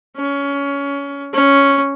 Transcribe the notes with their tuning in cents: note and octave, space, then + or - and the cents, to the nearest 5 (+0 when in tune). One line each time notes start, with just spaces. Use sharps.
C#4 +20
C#4 +0